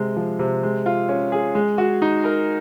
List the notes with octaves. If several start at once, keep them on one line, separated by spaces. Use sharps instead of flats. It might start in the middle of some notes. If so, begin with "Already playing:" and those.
Already playing: C3 G#3
F3
C3
G#3
F4
C#4
G#4
G#3
F#4
D#4
A#4